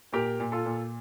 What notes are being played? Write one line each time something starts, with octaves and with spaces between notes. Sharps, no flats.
A#2 G4 A#4
A#2
F4 A4
A#2